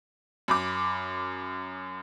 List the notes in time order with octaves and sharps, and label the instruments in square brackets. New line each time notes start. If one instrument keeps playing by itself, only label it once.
[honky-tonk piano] F#2 B5 D6